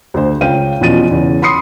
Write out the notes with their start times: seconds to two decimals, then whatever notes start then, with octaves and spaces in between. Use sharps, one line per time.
0.14 D2 C5
0.41 C#2 F5 G5 D#7
0.81 E2 B2 F3 C#4 A6 D#7
1.11 E2 C#3
1.42 B5 C6 D#6 C7 C#7